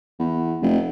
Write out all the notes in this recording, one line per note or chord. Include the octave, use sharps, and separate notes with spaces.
E2
F1